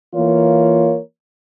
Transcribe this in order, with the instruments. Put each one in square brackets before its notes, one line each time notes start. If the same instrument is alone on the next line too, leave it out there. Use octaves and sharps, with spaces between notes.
[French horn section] E3 A#3 F4 A#4 C#5